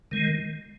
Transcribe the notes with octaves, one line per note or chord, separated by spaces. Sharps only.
D#3 G#3